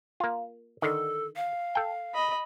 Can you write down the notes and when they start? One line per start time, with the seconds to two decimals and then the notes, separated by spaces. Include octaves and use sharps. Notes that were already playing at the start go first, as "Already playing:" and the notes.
0.20 A#3 F4
0.82 D3 D#3 A4
1.36 F5
1.75 A4 G5
2.14 D#5 B5